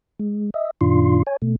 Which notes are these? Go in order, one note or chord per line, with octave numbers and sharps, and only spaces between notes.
G#3
D#5 E5
F#2 A#2 D#3 D4 F4 C6
C#5 G#5
B2 A3